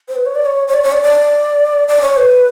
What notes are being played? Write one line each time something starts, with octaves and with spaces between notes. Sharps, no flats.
C5
B4
C#5
D5
C#5
C#5
D5
C#5
D5
D5
D5
C#5
B4